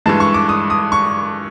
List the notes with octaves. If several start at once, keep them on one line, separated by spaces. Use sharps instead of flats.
G2 E3 G#3 A5
C#6
D6
D#6
D#6
C#6